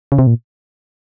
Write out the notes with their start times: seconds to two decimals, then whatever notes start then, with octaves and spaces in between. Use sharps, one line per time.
0.12 C#3
0.19 C3
0.27 A#2